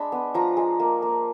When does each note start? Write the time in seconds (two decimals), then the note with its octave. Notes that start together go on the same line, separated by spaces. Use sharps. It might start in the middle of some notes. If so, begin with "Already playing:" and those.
Already playing: G#3 D4 B5
0.12 B3
0.34 F3 A#5
0.57 G#3
0.80 A#3
1.02 A#3